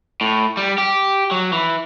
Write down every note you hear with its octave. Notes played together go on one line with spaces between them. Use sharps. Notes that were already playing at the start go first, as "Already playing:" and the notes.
A2
G3
G4
F#3
E3